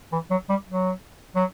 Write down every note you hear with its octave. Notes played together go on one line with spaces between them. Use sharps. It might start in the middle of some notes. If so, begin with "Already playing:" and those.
E3
F#3
G3
F#3
F#3